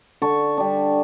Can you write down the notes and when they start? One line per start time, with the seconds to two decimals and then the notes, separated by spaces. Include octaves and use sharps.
0.22 D3 A5 C#6
0.57 G3 D4